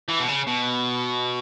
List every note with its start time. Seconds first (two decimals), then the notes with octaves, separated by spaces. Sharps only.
0.08 E3
0.19 B2
0.28 C#3
0.47 B2